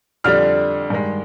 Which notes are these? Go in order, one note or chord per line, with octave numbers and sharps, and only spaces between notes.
F2 D3 G3 D4 F6
G2 D#3 G#3